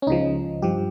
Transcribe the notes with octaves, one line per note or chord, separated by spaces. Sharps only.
C#4
C#2 C#3 F3 D#4
G2 F3 G4